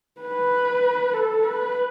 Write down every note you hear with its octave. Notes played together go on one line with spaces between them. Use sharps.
B4
A4
B4